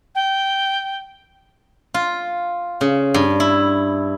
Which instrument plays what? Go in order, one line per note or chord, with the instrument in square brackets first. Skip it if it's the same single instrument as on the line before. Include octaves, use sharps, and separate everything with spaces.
[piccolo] G5
[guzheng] F4
C#3
G2
E4